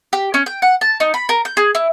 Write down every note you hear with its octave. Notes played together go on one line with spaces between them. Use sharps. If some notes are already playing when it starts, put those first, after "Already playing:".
G4
C#4
G5
F#5
A5
D#4
B5
A#4
G6
G#4
E4